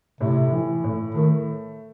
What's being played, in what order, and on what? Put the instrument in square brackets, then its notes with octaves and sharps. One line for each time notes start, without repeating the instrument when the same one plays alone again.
[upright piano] A2 [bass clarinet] C3
[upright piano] E3
A2
[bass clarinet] D#3 [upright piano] A3